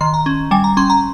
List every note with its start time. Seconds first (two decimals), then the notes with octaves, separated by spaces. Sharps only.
0.01 D#3 C6
0.14 A#5
0.26 C#4
0.51 G3 G#5
0.64 A#5
0.77 C#4 C6
0.90 A#5